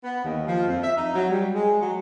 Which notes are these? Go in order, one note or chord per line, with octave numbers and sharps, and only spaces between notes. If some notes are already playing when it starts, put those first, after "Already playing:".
B3
D#2
F3
F2
E5
D#4
F#3
G3
G#3
F#3